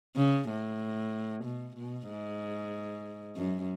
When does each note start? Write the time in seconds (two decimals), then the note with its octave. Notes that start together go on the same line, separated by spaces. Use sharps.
0.16 C#3
0.49 A2
1.45 B2
1.76 B2
2.09 G#2
3.36 F#2